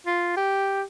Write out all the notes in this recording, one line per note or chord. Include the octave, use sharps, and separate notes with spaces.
F4
G4